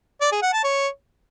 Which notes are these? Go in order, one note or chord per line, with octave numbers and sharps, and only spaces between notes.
D5
G#4
F#5
A5
C#5